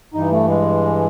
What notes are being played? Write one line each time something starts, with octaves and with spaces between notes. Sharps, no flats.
G2 E3 D#4
A3
G#3